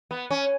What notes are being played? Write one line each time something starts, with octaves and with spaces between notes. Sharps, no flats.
B3
C#4